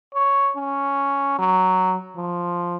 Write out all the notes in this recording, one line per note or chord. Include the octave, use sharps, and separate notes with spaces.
C#5
C#4
F#3
F3